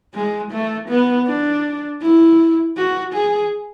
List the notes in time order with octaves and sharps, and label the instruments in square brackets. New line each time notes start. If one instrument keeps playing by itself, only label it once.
[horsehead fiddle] G#3
A3
B3
D4
E4
F#4
G#4